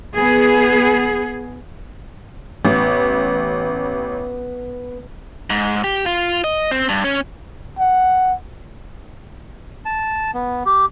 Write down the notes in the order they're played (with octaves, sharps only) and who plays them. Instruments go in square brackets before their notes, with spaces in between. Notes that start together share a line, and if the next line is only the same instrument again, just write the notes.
[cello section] B3 G#4
[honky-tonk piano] A1 [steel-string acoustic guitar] B3
[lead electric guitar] G#2
G4
F4
D#5
C4
G2
C#4
[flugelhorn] F#5
[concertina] A5
B3
G4